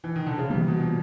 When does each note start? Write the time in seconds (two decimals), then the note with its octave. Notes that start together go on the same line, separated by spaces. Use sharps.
0.04 E3
0.16 D#3
0.27 D3
0.38 C#3
0.50 C3 E3 G3 A#3
0.68 B2
0.81 A#2